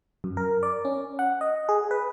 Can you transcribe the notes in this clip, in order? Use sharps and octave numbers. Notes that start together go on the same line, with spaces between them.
F#2
A#4
D5
C#4
F#5
D#5
G#4
B4